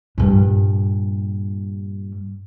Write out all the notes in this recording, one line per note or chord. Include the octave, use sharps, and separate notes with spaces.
G2 A#2